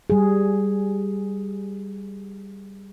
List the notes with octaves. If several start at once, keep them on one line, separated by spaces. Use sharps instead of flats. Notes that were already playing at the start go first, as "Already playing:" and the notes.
G3 G#4